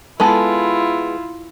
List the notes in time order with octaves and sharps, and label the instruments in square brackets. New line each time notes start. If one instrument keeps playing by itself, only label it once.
[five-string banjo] G#3 B3 A4 [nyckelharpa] E4 F4